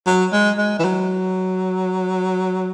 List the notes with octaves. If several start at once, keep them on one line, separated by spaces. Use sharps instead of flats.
F#3
G#3
G#3
E3
F#3